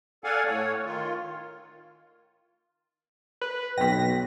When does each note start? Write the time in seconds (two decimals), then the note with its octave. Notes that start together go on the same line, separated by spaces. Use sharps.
0.24 A4 D5 F5 F#5 G#5
0.47 A2 C#5
0.85 D#3 F4
3.41 B4
3.78 B1 G5 A#6 B6